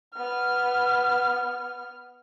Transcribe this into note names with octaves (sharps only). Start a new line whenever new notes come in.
B3 F6